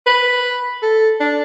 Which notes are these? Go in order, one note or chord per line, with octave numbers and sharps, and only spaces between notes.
B4
A4
D4